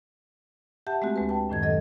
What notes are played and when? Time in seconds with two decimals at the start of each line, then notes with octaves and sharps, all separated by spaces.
0.87 G4 E5 F#5 A5 G6
1.02 G#3 A3 C4 F#4
1.16 D2 G#3 B4
1.29 G5 A5
1.49 F#2 A2 D#3 G#6
1.63 F#3 A4 D#5